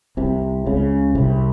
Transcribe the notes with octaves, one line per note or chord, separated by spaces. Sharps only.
C2 C3
C#2 C#3
C2 C3